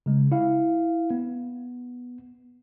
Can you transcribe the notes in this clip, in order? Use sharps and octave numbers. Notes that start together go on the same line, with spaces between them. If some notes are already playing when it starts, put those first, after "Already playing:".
C#3 G#3
E4 F5
B3